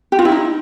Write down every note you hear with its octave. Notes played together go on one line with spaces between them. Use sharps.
G4
F4
E4
D#4